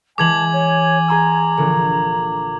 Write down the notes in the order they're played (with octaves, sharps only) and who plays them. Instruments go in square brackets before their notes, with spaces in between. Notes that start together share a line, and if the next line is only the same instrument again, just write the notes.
[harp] E3 G#3 [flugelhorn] G#5 [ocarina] A5 [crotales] D6 G#6 F#7
[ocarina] C#5
[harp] G#4 C6 E6 [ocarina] A#5
[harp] A#1 D3